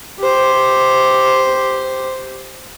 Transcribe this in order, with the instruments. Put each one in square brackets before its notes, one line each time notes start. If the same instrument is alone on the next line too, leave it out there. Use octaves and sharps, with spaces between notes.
[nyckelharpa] G4 C5